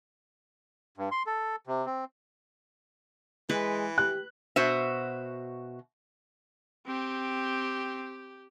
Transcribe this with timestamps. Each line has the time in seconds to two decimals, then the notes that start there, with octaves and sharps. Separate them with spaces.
0.98 G2
1.11 C6
1.26 A4
1.67 C3
1.86 C4
3.49 E3 G#3 B4
3.98 G4 F#6
4.56 B2 F#4 C5 E5
6.87 C4 G4